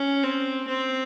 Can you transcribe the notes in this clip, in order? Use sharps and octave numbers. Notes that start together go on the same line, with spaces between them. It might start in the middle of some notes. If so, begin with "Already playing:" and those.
Already playing: C#4
C4
C4